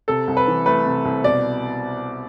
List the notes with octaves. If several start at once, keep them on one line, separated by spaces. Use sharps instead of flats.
C3 A4
C2
B4
E3
A3 B4
C3
C2
B2 D5